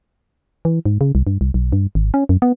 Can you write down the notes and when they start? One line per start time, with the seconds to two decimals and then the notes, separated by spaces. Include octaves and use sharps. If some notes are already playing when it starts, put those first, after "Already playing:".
0.65 E3
0.86 G#2
1.01 C#3
1.15 C2
1.27 G2
1.41 C2
1.54 B1
1.73 G2
1.95 G#1
2.14 C#4
2.29 F#2
2.42 B3